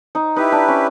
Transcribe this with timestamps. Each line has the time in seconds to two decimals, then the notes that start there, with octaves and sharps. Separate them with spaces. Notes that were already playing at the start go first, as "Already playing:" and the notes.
0.15 D#4
0.36 D#4 E4 G4 B4
0.52 D4
0.68 C#4